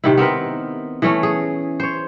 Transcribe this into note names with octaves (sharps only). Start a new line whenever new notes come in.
C3 D#3 E4
B3 C4 A#4 B4
E3 A3 C#4
G#4
C5 C#5